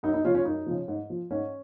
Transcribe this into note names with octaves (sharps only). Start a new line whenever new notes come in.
F#2 D#4 F#4
D#4
C#3 F3 C#4 F4
C#4 F4
F#2 D#4
C#3 F3
G#2
F3
G#2 C#4